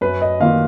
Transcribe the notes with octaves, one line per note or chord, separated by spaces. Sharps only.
F#2 B4
D#5
D#3 A#3 F4 F5